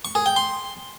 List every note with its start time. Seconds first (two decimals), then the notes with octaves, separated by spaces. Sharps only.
0.05 C#6
0.15 G#4
0.26 G5
0.36 C6